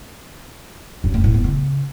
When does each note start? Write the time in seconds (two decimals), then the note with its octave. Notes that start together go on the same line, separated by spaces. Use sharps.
1.04 F#2
1.14 A3
1.24 A2
1.34 B3
1.44 C#3